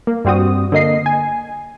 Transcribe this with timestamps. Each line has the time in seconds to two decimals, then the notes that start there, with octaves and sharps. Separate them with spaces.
0.07 A#3
0.25 G2 G3 C4 F#4 D#6
0.72 D3 A#3 D#5 C7
1.06 G#5